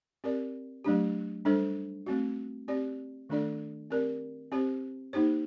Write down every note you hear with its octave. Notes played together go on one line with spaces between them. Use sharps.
C4 G4 A#4 D5
F#3 A3 D4 G4
G3 D4 A4 C5
A3 C4 F#4
C4 G4 D5
D#3 A3 D4 A4 D5
C4 G4 A#4 D5
C4 G4 C5
A#3 D#4 G4 C5